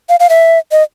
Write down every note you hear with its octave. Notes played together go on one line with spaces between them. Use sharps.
F5
F5
E5
D#5